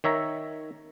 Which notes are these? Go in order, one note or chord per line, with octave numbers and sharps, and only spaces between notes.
D#3 C#5 E5 A#5